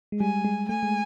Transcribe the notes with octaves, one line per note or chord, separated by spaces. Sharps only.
G#3
G3 G#5
G#3
A3 G#5
G#3